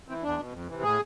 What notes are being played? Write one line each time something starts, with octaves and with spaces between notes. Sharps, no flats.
E3 C4
E2 D4
B2
F2
C3 E3
A2 G#4